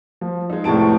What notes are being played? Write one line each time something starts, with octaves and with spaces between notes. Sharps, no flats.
F3
G#3 D#4
F1 A2 C3 A5 D7